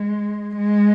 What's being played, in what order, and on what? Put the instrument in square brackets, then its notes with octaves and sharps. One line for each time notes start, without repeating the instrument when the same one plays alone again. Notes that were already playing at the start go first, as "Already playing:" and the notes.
Already playing: [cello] G#3
G#3